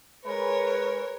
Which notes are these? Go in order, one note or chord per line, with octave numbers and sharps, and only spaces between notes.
G#3 A#4 B4 C#5